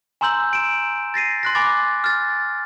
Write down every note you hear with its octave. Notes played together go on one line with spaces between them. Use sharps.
G#5 A#5 C6 E6 G6 F#7
D7 E7
A6 A#6 C7 D#7
C6 F#6 A#6
G#5 B5 D6 A6
F6 A6